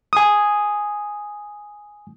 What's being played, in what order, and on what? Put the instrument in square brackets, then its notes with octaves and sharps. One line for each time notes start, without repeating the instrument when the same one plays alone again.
[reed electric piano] G#5 D#6